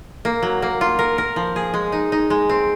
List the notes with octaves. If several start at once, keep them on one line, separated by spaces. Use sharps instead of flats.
A#3
F#3
A#3
F4
A#4
A#4
F3
G#4
G#3
D#4
D#4
G#3
C4